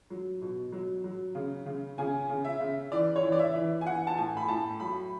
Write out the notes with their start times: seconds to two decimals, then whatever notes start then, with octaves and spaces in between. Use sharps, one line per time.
0.10 F#3
0.42 B2
0.72 F#3
1.04 F#3
1.35 C#3
1.66 C#3
1.98 C#3 G#5
2.29 C#3
2.45 E5
2.60 C#3
2.92 E3 D5
3.16 C#5
3.23 E3
3.32 D5
3.39 E5
3.55 E3
3.81 G#5
3.86 E3 F#5
4.07 A5
4.17 A2 G#5
4.37 B5
4.48 A2 A5
4.80 F#3 B5